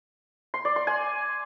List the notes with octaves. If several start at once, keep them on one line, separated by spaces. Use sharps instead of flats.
C6
D5
C6
G#5